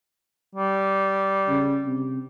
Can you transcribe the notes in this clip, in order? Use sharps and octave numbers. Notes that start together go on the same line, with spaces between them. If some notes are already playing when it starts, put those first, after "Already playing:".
G3
C#3
C3